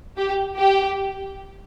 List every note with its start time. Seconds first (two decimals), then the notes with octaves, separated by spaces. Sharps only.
0.17 G4
0.59 G4